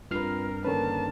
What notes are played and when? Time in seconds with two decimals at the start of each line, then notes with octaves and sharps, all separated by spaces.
0.11 G2 C4 F4 A#4 B4 F6 C7
0.65 D3 D#3 A#3 C#4 A#4 B4 A5